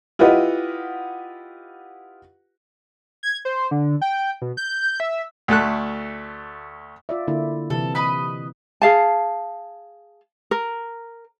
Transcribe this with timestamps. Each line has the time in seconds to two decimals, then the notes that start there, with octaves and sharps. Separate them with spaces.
0.19 E4 F4 G4 B4 D#5 F#5
3.23 G#6
3.45 C5
3.71 D3
4.02 G5
4.42 B2
4.57 G6
5.00 E5
5.48 D2 A3 A4 F#6
7.09 F4 D5 E5
7.28 D3 A#3 E4
7.70 C3 E3 A4
7.95 B4 D#5 B5
8.82 G#4 F5 A5
10.51 A#4